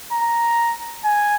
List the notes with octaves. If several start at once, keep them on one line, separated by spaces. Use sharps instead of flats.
A#5
G#5